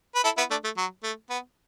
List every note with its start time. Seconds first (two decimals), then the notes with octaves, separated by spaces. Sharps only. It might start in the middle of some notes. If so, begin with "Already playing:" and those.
0.15 B4
0.24 E4 A4
0.37 B3 E4
0.50 A3 D4
0.64 A3
0.77 F#3
1.03 A3
1.30 B3